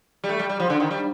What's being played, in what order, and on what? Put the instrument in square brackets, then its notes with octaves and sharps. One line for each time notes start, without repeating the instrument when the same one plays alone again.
[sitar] G3
A3
G3
G3
F3
D3
D#3
G3